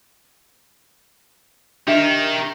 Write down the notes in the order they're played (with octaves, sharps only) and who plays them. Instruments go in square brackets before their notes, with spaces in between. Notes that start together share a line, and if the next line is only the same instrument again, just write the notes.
[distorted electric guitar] D#3 D#4 [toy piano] D4 E5 [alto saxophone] G4